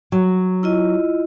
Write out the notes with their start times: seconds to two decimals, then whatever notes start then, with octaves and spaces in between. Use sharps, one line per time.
0.12 F#3
0.63 E4 F4 D#5